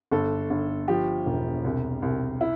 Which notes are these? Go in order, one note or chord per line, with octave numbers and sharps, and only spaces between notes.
G1 A4
G1
F3 G4
E1
C2
C2
E4